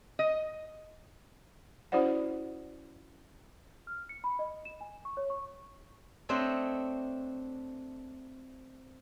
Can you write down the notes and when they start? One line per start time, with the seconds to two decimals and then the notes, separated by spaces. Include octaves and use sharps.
0.19 D#5
1.92 C#4 E4 F#4 C5 D5 F#5
3.87 F6
4.09 C#7
4.24 B5
4.39 D#5
4.65 E7
4.81 G#5
5.05 C#6
5.17 C#5
5.30 C#6
6.29 A3 C4 D4 C5 C#5 D#5